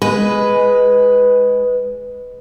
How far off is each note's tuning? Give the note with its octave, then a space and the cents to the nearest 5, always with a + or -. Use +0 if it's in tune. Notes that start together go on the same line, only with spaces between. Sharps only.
G#3 +0 B4 +5